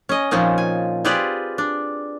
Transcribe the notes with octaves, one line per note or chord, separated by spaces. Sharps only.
C#4 D#5
A#2 F3 C4 C#4 D#4
G#5
C4 F4 G4 G#4 B4 D5
D4